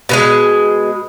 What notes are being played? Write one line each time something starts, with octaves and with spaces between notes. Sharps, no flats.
B2 E3 G#3